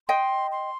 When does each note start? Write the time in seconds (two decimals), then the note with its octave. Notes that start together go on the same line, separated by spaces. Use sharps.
0.08 D#5 G5 C6
0.52 C6